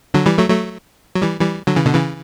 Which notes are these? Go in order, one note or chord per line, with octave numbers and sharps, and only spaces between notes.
D3 F#3
E3 G3
F#3 A3
F#3 A3
F#3
E3 G3
E3 G3
D3 F#3
C#3 E3
B2 D3
C#3 E3